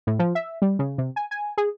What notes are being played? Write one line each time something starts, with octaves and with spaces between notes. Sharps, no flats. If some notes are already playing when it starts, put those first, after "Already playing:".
A2
F3
E5
G3
C#3
C3
G#5
G#5
G#4